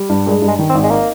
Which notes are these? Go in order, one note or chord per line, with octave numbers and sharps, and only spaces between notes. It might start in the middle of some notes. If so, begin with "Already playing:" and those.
Already playing: G3
G2
A#2 G#3
G2
G#3
D#3
C4
G#1
G#3
A#3 D#4